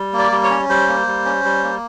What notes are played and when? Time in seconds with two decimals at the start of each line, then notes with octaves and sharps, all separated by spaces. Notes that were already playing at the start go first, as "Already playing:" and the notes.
Already playing: G3
0.13 A#3
0.19 D5
0.32 G3
0.44 C#5
0.51 C#4
0.69 G3 C5
0.88 A#3
1.07 G3
1.25 C#4
1.44 G3
1.64 A#3